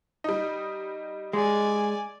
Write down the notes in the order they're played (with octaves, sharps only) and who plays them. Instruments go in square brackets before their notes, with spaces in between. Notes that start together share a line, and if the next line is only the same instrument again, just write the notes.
[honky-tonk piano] G3 D#4
[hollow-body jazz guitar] G#3 [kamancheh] D5 G#5